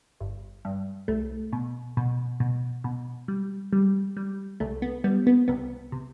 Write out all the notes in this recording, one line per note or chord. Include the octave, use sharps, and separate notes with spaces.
G1
G2
C2 A3
B2
B2
B2
B2
G3
G3
G3
C2 A3
B3
G3 B3
B3
C2 B3
C3